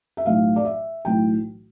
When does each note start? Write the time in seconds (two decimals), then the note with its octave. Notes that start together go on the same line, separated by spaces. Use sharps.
0.17 E5
0.25 B1 A2 E3 F5
0.56 D5
0.65 E5
1.05 B1 A2 E3 G5